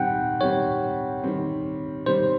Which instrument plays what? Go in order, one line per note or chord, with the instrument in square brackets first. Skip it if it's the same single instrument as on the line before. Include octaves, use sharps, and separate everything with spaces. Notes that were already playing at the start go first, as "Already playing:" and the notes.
Already playing: [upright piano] D#3 G3 C4 [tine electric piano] F#5 G5
[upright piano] D#3 G3 C4 [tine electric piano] C#5
[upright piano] D#3 G3 C4
[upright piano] D#3 G3 C4 [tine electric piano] C5